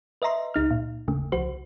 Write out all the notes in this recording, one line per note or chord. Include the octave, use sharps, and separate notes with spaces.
B4 D#5 E5 A#5 C6
C#2 D#4 F6
A#2
G1 D#2 C#3 A3
C2 F3 F#4 C5